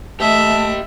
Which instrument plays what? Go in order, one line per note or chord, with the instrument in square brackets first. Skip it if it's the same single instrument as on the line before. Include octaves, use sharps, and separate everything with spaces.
[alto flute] A3 [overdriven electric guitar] G4 D#5 [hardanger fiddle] E5 [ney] A5